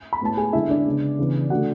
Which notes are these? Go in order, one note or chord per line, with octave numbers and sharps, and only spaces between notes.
B5
A2 G#3 B3 A5
G#4 G#5
D3 G#3 B3 E4 E5
D4 D5
C#3 G#3 B3
C#3 E3 B3
D3 A3 F#4 F#5